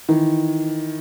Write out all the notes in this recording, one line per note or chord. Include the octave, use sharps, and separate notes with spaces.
D#3 E3